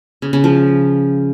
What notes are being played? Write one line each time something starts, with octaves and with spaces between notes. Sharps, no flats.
C#3
C#3
F3